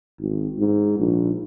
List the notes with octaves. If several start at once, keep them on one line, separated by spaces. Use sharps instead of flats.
G#1
G#2
A#1